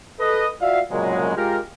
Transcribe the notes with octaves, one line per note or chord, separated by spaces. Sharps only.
A4 B4 D#5
F4 F#4 D5 E5 F5
C2 F#2 A#2 C#3 F#3 G#3
G#3 F4 G4 A#4